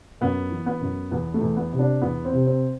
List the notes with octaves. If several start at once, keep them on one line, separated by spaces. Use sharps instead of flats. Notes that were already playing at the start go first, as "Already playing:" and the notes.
F#2 B3
E3
B3
F#2
E2 B3
A3
E2
B3
C3
D4
E2 B3
C4
C3
C4